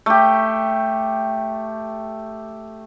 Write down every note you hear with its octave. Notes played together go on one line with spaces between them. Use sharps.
A3 G4